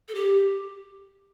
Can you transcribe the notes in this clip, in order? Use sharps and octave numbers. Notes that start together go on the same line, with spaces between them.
A4
G4